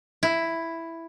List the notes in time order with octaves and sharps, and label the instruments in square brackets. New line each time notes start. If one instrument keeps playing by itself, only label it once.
[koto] E4